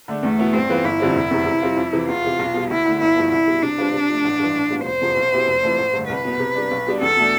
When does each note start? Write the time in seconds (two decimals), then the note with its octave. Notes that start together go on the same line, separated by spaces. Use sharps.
0.08 D3 A3 D4
0.23 E2 A3
0.39 B2 B3 E4
0.54 G2 C4
0.70 E3 B3 F4 B4
0.84 G1 E4
1.00 F2 D3 G3 C4
1.16 F1
1.31 E2 C3
1.46 C3
1.62 G3 C4 F4
1.77 F2
1.93 C3 E3
2.08 E2 F4
2.24 C3 E3
2.39 B1
2.54 B2 G3
2.70 D2 E4
2.85 D3 A3
3.01 G1 E4
3.16 G2 F3 B3
3.32 C2 E4
3.48 B2 G3
3.63 C3 D4
3.78 G3 C4 F4 B4
3.93 C3
4.09 F3 A3
4.24 A1
4.39 G2 E3
4.55 A1
4.70 A2 G3 B3 F4
4.85 F1 C5
5.01 E2 C3 F3
5.17 B1
5.32 B2 B3 E4 G4
5.47 F1
5.63 F2 E3 A3
5.78 A1
5.93 G2 D3 A3
6.09 C2 B4
6.25 B2 B3
6.40 C3
6.55 G3 D4
6.71 B1
6.87 B2 G3 D4
7.01 E2 A4
7.17 B2 A3 D4